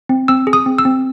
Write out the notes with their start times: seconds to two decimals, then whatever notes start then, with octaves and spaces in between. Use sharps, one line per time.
0.09 C4
0.28 C4 E6
0.47 G#4
0.53 D#6
0.66 C4
0.78 E6
0.85 C4